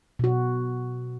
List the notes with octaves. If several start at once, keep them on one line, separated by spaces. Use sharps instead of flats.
B2 F#4